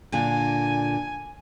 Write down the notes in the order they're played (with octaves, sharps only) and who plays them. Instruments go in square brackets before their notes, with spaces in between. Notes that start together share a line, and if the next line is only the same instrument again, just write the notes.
[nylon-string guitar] A#2 D3 [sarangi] G#5